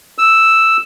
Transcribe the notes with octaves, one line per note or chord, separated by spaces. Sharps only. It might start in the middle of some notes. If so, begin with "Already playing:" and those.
E6